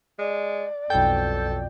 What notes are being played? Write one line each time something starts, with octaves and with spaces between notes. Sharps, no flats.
G#3 D5
B1 F2 B2 A4 G5